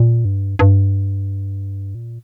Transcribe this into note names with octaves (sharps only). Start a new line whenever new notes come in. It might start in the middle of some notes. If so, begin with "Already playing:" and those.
Already playing: A#2
G2
G2
A#2